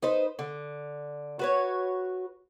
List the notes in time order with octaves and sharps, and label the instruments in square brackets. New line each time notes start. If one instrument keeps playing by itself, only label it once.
[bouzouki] D#4 B4 C5
D3
F#4 B4 C#5